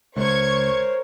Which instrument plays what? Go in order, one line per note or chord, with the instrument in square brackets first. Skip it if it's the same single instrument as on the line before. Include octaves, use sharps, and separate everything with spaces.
[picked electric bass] C#2 [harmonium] A#4 C5 C#5 [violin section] C#6 G#6